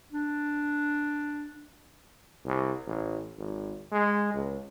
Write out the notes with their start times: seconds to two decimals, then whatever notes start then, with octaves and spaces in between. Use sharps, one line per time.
0.12 D4
2.46 C2
2.87 A1
3.38 G#1
3.92 G#3
4.34 C#2